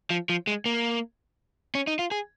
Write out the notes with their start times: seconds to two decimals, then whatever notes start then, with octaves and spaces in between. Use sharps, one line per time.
0.10 F3
0.29 F3
0.47 G#3
0.66 A#3
1.75 C#4
1.87 D#4
1.99 F4
2.11 G#4